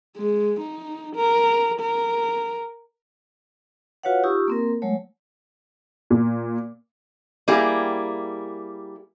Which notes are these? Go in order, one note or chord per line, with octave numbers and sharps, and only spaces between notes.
G#3
D#4
A#4
A#4
F4 F#4 B4 C#5 F5 F#5
D#4 F4 G4 C#6 D#6 E6
A#3 C4 A#4
F#3 G#3 A3 C#5
A#2
G3 A#3 E4 G4 G#4